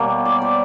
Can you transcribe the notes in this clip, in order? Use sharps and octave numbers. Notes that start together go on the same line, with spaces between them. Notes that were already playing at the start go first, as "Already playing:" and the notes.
Already playing: B2 G3 A#3 C#5
D5
C5